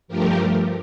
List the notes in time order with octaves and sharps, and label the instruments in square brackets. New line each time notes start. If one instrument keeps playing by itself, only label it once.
[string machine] G2 F3 A3 G4 A#4